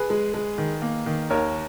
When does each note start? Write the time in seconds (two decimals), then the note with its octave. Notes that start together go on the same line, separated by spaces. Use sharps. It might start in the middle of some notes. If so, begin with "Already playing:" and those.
Already playing: G#4 B4
0.10 G#3
0.34 G#3
0.58 D#3
0.82 A#3
1.06 D#3
1.30 D#2 A#4 C#5